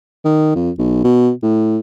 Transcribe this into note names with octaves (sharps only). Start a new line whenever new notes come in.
D#3
F2
B1
B2
A2